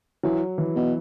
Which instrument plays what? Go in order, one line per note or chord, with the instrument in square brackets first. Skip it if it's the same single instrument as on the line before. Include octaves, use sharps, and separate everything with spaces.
[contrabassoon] E3 [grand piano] F#3
[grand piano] E3
[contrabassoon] B2